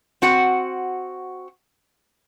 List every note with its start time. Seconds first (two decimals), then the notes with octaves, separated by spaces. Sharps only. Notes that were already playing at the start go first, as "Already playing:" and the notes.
0.22 C4 F#4 F#5